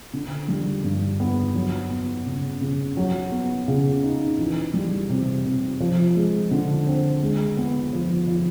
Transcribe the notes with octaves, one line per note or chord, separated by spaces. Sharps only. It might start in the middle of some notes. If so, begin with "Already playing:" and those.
D3
G3
G2
B3
F#3
B3
C#3
C#3
F#3
B3
C#3
D#4
E3
G3
C3
C3
F3
G#3
D3
C4
G#3
B3
F3
F3